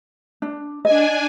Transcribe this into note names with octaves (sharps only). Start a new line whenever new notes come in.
D4
D4 D#5 G#5